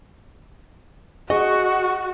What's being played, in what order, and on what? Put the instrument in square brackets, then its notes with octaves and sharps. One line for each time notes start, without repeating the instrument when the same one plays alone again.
[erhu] F#4 [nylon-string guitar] G#4 [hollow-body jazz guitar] D#5 [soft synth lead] C#6